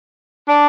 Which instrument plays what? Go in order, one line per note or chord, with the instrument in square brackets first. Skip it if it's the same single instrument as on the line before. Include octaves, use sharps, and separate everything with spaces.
[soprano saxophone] D4